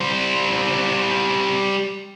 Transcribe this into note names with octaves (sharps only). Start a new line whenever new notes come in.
G3 C5